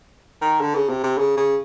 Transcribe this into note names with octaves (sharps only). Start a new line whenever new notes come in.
D#3
D3
C#3
C3
C3
C#3
C#3